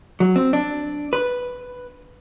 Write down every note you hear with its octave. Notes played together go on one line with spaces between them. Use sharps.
F#3
C4
D4
B4